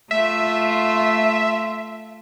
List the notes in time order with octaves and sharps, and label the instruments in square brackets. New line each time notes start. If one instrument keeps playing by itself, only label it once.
[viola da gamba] A3 F4 [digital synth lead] E5